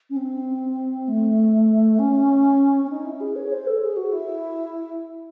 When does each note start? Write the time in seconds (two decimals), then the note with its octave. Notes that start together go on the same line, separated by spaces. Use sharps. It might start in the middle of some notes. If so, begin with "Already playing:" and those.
0.10 C#4
0.16 C4
1.08 A3
1.99 C#4
2.84 C#4
2.89 D#4
3.05 E4
3.20 G#4
3.36 C#5
3.51 C5
3.67 A4
3.81 G#4
3.96 F#4
4.12 E4